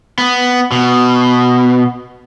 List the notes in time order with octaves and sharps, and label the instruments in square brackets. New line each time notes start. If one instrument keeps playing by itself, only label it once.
[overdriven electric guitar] B3
B2